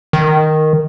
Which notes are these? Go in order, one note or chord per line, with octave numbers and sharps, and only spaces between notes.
D#3